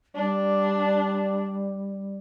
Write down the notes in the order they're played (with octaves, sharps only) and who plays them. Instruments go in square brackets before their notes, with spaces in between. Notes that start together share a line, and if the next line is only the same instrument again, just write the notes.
[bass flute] G3 [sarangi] D4